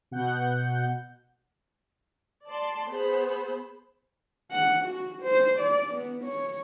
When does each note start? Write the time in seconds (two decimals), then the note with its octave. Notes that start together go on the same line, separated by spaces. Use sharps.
0.11 B2 F#5 G6
2.46 D5 A5 C6
2.88 B3 G#4 C5 B5
4.51 F#5
4.85 F#4
5.22 C5
5.60 D5
5.94 B3
6.25 C#5